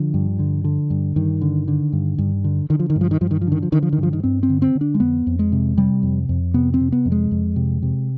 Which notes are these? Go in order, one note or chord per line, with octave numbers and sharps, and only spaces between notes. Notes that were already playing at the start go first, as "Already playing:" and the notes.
Already playing: D3 F3
G2
D3
D3
G2
G2 D#3
D3
D3
G2
G2
D3
D3 D#3
F3
D#3
G2
F3
D#3
G2 F3
D#3
F3
D3 D#3
F3
D3 D#3
F3
D#3
G2
F3
D#3
G2 C4
C4
D3
C4
D3
D4
G#3
F2 B3
F2
G#3
C3
C3 G3
F2
F2
C3 B3
C4
C3
B3
F2
G#3
F2
C3
C3